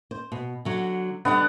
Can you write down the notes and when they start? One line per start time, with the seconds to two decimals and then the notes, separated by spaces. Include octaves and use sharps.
0.11 C5
0.32 B2
0.65 D3 F#3
1.25 D3 G3 B3 D4 F#5